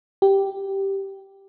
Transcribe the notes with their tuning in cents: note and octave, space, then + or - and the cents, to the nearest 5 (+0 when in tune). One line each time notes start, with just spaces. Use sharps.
G4 -5